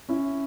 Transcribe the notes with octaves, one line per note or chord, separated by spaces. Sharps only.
C#4 E4